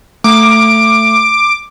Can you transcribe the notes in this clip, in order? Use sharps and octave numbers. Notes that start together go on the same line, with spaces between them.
A3 D6